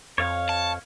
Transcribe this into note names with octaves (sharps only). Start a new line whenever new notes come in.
F2 C#5 F5
A5